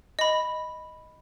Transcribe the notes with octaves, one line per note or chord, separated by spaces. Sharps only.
D#5 B5